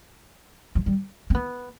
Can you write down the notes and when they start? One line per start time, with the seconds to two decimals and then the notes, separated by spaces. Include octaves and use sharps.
0.75 F3
0.86 G3
1.30 C4
1.35 B3